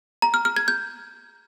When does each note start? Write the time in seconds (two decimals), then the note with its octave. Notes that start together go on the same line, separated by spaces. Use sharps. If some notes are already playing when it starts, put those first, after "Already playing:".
0.22 A#5
0.34 F6
0.45 F6
0.56 G#6
0.68 G6